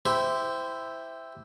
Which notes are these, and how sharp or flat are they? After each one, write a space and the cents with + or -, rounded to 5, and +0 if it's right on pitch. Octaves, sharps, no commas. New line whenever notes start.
E4 +0 G4 +5 C5 -20